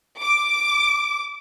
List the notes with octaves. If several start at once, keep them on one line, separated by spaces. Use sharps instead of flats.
D6